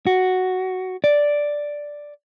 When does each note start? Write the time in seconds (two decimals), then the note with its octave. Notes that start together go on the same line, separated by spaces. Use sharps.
0.07 F#4
1.04 D5